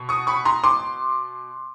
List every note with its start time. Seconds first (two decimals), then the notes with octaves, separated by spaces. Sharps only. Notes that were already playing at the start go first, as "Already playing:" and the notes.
Already playing: B2
0.09 C#6 D#6
0.27 B5 C#6
0.45 A#5 C6
0.64 C6 D6